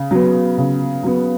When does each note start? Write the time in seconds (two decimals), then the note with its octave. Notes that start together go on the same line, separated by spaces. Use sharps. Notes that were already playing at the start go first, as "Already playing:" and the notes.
Already playing: C#3
0.11 F#3 B3
0.58 C#3
1.03 F#3 B3